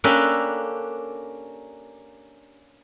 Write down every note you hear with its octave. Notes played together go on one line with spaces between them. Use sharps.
A#3 C#4 D4 G4 A4 B4